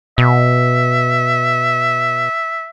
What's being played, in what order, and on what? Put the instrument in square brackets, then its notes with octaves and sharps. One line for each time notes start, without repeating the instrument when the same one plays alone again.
[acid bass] B2 [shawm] E5